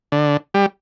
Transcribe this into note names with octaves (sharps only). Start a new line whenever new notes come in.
D3
G3